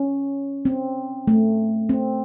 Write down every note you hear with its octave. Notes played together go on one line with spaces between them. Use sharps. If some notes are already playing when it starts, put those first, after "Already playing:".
Already playing: C#4
C4
A3
C4